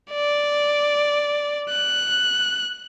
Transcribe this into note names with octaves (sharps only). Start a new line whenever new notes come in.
D5
F#6